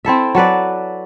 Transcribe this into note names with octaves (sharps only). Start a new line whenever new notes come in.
C4 E4 A4 E5
F#3 A4 B4 D5